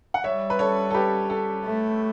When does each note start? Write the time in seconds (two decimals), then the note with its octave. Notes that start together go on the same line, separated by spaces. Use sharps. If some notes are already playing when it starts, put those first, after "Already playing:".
0.14 F#5
0.24 G3 C#5 E5
0.50 B4
0.59 A4 C#5
0.91 A4
0.94 G4 B4
1.30 A4
1.65 A3